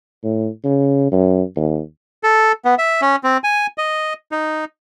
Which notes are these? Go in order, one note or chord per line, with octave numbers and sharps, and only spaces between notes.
A2
C#3
F#2
D#2
A4
B3
E5
C#4
C4
G#5
D#5
D#4